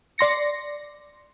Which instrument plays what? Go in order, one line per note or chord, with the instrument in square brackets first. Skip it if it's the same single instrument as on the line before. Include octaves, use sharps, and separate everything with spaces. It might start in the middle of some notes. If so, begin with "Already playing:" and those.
[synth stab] D5 C6 A#6 C#7